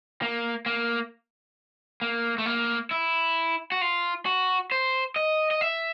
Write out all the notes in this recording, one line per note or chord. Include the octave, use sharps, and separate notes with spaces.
A#3
A#3
A#3
A3
A#3
E4
F#4
F4
F#4
C5
D#5
D#5
E5